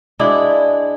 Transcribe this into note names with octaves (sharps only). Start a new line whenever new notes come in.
G#3 D4 E4 F#4